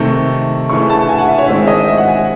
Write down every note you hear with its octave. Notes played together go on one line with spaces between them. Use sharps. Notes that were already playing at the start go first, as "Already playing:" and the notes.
Already playing: C3 D#3 A3 C#6
C#3 E3 A3 C#6
A5
G#5
F#5
E5
C#5
D#3 G#3 C4 E4 E5
D#5
E5
F#5
G#5